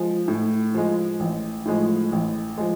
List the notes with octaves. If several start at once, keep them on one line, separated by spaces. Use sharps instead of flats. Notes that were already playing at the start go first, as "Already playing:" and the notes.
Already playing: F3 G#3
A2
F3 G#3
A1
A2 F3 G#3
A1
F3 G#3